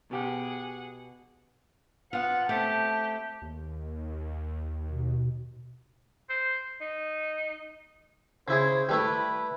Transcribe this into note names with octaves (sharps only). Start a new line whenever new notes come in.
B2 G4 G#4 F#5
B3 F4 F#5
A3 C4 G4 A5
D#2
B2
C5
D#4
C#3 E4 G#4 C5
G3 A3 E4 B4